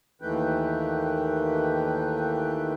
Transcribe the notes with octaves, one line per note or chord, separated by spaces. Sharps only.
D#2 D#3 E3 A3 B4 G5